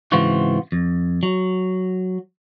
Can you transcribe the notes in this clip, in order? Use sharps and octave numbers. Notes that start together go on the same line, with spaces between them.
G#2 C#3 E3 C4 F4 F#4
F2
F#3